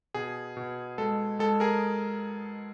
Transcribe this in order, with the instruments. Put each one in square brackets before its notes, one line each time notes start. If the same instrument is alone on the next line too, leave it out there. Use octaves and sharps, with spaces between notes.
[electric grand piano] B2 G#4
B2
G#3 A4
G#3 A4
G#4 A#4